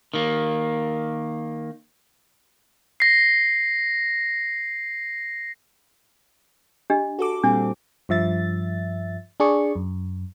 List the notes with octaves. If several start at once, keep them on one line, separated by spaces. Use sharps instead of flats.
D#3 A#3
A#6 C7
D4 G4 D#5
F#4 A4 D6
A#2 G3 C4 D4
G2 F3 E5 A6
D4 G#4 D5 C#6
F#2